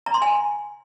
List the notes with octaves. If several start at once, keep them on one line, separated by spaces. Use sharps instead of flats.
A#5
C6
G#5